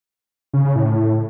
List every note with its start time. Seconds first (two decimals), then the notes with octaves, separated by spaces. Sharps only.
0.53 C#3
0.65 C#3
0.76 A2